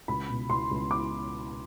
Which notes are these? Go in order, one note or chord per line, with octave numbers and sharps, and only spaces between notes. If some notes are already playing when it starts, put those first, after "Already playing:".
C#2 B5
B2
C#2 C6
C#2
D6